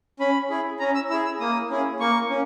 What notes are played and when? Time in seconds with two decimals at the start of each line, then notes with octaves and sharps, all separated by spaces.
0.20 C#4 B5
0.50 E4 G#4
0.79 C#4 A#5
0.95 E6
1.10 E4 E6
1.14 G#4
1.25 E6
1.40 A#3 D#6
1.70 C#4 E4 G#4
2.00 A#3 C#6
2.30 C#4